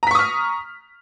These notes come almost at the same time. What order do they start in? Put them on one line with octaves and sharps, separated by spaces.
A#5 B6 C#6 D#6 F6